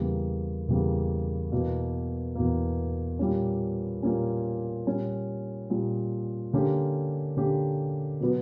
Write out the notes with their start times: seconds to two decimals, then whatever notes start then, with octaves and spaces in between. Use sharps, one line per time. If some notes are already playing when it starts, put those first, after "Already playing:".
Already playing: E2 C#3 G3 A#3
0.68 E2 C#3 G3 A#3
1.52 E2 B2 A#3
2.35 E2 B2 A#3
3.19 A#2 G3 A#3 C#4
4.03 A#2 G3 A#3 C#4
4.87 A#2 G3 C#4
5.70 A#2 G3 C#4
6.53 D3 A#3 C#4 G4
7.37 D3 A#3 C#4 G4
8.20 B2 F#3 B3 F#4